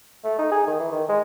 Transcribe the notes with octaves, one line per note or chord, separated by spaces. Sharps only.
A3
D#4
G#4
D#3
E3
D#3
G#3